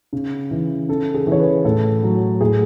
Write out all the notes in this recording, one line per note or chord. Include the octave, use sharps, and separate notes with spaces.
C#3
E3
C#3 A4
G#4
E3 C#5
B4
A2 A4
F#3
A2 G#4